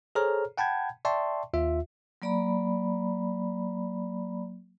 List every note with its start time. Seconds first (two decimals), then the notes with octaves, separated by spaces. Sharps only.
0.15 G#4 A4 C5 C#5 A#5 F6
0.58 F#5 G5 A5 B5 G6 G#6
1.05 D5 E5 G5 A5 C6 C#6
1.54 D#2 F4 E5
2.22 F#3 A#3 D5 A#5 B5